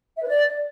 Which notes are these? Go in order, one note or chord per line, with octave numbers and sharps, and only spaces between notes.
E5
B4
D5